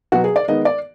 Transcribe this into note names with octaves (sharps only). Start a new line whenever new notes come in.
B2 F#3 B3 F#4
G#4
D5
D#3 G#3 B3 D#5
D5